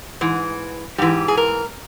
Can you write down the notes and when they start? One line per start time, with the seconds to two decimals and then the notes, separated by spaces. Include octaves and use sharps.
0.21 G#2 E3
0.98 G#2 E3 G4
1.28 G#4
1.37 A#4